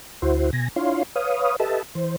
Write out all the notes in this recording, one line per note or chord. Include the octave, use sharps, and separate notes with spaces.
D2 E4 F#4 C5
B2 G#5 A#6
D4 E4 F4 C#5 F5 C6
B4 C#5 F5 D#6
G4 A4 B4 D#5 E5 A5
E3 C5